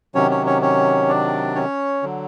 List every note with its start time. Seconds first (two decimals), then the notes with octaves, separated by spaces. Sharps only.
0.15 C3 D#3 F#3 C#4 C#5
0.31 C#4 C#5
0.46 C#4 C#5
0.62 C#4 C#5
1.09 D4 D5
1.55 C#4 C#5
2.03 D3 F#3